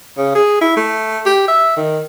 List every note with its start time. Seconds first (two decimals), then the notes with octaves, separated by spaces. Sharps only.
0.17 C#3
0.35 G#4
0.61 E4
0.77 A3
1.26 G4
1.48 E5
1.77 D#3